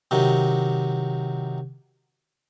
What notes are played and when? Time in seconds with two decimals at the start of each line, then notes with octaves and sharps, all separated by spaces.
0.11 C3 D#3 F#3